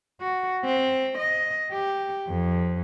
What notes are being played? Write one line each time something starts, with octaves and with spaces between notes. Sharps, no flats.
F#4
C4
D#5
G4
F2